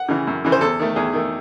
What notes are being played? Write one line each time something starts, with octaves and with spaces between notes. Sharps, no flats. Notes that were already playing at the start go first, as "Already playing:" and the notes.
Already playing: F#5
C#3 E3
F#2
C#3 E3
C5
E2 A4
D#3 A3
E2 G#4
D#3 A3